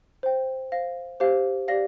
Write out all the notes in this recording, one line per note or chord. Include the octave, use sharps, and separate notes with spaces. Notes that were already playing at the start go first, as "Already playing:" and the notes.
C5 G5
C5 F5 A#6
G4 C5 F5
G4 D5 F5 A#6